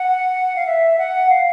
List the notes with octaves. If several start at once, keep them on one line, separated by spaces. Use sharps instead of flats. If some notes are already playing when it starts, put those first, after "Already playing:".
Already playing: F#5
F5
E5
F#5
F5